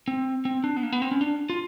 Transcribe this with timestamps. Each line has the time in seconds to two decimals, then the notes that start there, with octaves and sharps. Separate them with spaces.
0.08 C4
0.45 C4
0.64 D4
0.77 B3
0.83 A#3
0.93 B3
1.02 C4
1.12 C#4
1.21 D4
1.50 F4